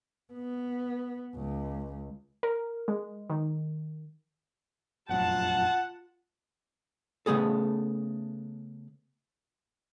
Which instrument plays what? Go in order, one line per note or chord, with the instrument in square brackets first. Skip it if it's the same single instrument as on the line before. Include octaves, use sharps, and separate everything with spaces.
[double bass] B3
C#2
[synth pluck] A#4
G#3
D#3
[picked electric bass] F1 A#1 F#2 [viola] F4 A5 [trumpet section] F#5
[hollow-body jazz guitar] C#3 A3 B3 G#4 A4